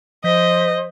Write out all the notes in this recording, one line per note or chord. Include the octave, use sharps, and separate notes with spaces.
F3 C5 D#5 G6 B6